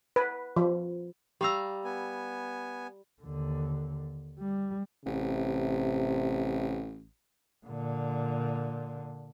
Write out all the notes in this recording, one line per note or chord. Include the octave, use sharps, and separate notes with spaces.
B4
F3
G3 G4 F5 A#5 E6
B3 G#5
D#2 D3
G3
A1 C3
A#2 D3